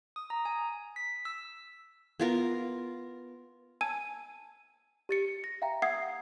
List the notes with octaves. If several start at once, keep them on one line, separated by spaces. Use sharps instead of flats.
D#6
A#5
G#5
B6
E6
B3 F4 A#4
G#5 A5 E6 G#6 D#7
G4 A6 C#7
A#6
E5 F5 G5 A#5
E5 F#5 D#6 E6 G#6 C7